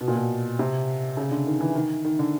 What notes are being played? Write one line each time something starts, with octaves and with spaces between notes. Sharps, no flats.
B2
A#2
B2
C3
C#3
D3
D#3
E3
D#3
D#3
D3